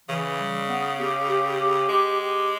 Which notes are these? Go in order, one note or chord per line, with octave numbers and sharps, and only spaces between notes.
C#3 E3
G3
B3
G4
G4
G4
G#3 G4
G4